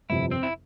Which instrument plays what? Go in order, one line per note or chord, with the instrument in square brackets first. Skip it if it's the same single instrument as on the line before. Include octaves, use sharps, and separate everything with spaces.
[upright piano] G1 F2 C3 [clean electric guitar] E4
[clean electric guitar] C4
E4